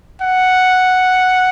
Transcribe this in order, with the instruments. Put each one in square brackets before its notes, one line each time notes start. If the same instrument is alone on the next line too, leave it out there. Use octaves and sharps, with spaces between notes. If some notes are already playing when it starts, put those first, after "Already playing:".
[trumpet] F#5